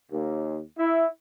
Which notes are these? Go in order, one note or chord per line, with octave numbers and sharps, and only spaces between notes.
D#2
E4